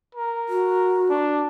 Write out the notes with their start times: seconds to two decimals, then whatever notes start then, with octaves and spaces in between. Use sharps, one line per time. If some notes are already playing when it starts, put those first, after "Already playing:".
0.15 A#4
0.49 F#4
1.09 D4